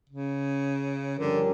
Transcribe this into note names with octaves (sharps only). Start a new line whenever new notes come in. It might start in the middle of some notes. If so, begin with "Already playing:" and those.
C#3
G2 D3 F3 C#4 G4 A#4